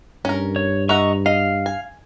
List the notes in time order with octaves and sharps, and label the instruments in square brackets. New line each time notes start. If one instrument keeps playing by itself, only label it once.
[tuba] G2 [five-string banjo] C#4 A#4
[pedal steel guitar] C#5
[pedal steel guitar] D#5 A#5 C#6 [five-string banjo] E5 F#5
[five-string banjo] D#5 [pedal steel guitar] F5
[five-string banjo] G#5